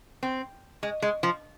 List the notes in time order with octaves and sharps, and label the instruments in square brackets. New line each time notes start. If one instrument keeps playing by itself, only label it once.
[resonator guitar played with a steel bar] C4
G#3
G#3
F3